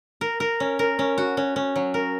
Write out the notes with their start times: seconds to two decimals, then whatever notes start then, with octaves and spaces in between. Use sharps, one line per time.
0.21 A#4
0.40 A#4
0.60 C#4
0.79 A#4
0.99 C#4
1.18 F#4
1.37 C#4
1.56 C#4
1.76 F#3
1.94 A#4